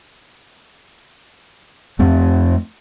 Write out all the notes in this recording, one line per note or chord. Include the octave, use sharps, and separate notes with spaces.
F2 A3 C4